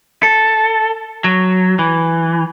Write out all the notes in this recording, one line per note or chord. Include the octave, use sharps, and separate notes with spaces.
A4
F#3
E3